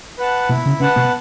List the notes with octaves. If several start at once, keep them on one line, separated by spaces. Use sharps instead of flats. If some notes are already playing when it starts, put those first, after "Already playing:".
B4 F#5 A5
B2 B3 E4
C#3 C#4
C#3 C#4 B4 F#5 A5
B2 B3